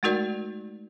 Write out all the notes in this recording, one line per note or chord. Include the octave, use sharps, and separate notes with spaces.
G#3 A3 D#4 F#4 A#4 D5